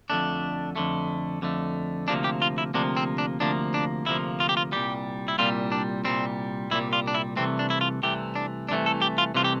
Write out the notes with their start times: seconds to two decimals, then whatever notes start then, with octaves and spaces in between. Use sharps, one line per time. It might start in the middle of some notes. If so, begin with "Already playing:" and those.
0.10 F2 D3 A3 D4
0.76 F2 D3 A3
1.42 F2 D3 A3
2.08 D2 C3 F3 A#3 D4
2.24 G4
2.42 F4
2.58 E4
2.74 D2 C3 F3 A#3 D4
2.97 C4
3.18 D4
3.40 D2 C3 F3 A#3 D4
3.74 D4
4.06 D2 C3 F3 A#3 E4
4.40 F4
4.49 G4
4.57 F4
4.72 C2 A#2 G3 G4
5.28 E4
5.38 C2 A#2 G3 F4
5.72 D4
6.05 C2 A#2 G3 C4
6.71 C2 A#2 G3 E4
6.93 F4
7.08 D4
7.15 E4
7.36 C2 C3 E3 A3 C4
7.59 D4
7.70 E4
7.81 F4
8.03 C2 C3 E3 A3 G4
8.36 D4
8.69 C2 C3 E3 A3 D4
8.86 A4
9.02 G4
9.18 F4
9.35 C2 C3 E3 A3 F4
9.44 G4